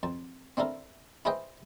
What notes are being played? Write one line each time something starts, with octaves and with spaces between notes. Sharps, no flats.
F2 A5
C4 D4 E4 A4 A#4
E4 G#4 B4 C5 D#5 G5